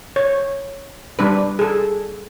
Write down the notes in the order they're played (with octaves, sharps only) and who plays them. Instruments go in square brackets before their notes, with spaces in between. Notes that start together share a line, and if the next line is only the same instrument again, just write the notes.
[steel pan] C#5
G3 D4 B4
G#4 A4